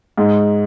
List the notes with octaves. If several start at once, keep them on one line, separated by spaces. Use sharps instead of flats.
G#2